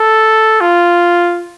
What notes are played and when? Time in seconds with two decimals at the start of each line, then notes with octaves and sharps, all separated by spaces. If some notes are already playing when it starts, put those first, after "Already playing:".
Already playing: A4
0.61 F4